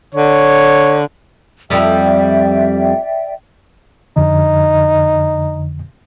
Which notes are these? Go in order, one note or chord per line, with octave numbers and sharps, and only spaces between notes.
D3 C#5
F2 G3 D5 E5 G5
F2 D3 D#4